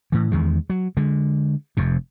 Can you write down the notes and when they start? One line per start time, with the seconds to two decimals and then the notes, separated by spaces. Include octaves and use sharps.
0.12 A2 E3
0.32 E2 D#3 G#3
0.70 F#3
0.97 D3 G#3
1.77 F1 F2 C3